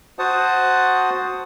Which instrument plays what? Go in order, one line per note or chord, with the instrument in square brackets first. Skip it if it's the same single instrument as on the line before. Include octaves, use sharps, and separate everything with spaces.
[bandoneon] F#4 C5 F#5 A5 D#6